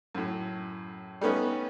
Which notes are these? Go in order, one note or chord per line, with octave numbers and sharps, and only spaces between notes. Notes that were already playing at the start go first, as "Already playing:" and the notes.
F#2 A2
G3 A3 B3 C#4 D#4